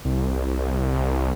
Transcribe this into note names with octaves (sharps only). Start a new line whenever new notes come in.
C2